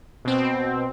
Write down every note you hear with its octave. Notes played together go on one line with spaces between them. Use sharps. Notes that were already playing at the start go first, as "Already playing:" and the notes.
B2 C4